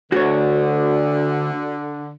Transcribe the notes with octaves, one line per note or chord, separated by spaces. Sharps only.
D2 D3 F#4 C#5